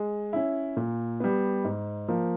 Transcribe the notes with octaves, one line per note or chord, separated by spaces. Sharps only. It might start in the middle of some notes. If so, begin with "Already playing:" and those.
Already playing: G#3
C#4 E4
A#2
G3 B3
G#2
F3 A#3